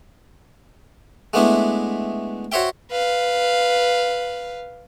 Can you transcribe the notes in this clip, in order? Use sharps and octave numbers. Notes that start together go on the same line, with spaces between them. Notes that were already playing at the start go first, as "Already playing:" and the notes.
G#3 A3 B3 D4 E4
F#4 C5 C#5 E5 G5
B4 F5